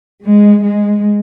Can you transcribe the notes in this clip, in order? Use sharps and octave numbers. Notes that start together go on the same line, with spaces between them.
G#3
G#3